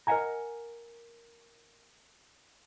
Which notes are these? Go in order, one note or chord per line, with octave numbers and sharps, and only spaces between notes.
A#4 D#5 E5 F#5 G#5 A#5